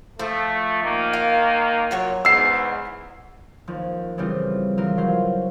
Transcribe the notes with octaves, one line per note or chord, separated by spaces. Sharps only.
F3 A3
D#3 A#3
F5
A#2 F#3 C#5
E2 G#2 B3 E6 C7
D#2 F3
C#3 E3 F3 G3 C4 F4
E3 F3 F4 A#4
F#3 C5 F5